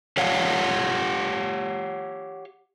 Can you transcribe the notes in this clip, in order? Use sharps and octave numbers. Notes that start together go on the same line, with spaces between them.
G4 C#5 F5 F#5